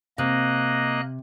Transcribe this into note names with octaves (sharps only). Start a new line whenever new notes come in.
C3 A#3 D#5 F#6